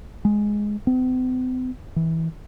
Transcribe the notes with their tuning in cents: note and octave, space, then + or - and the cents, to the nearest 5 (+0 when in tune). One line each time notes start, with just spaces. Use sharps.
G#3 +0
C4 -45
E3 -20